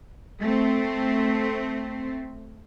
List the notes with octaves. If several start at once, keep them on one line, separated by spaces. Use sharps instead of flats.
A3 C4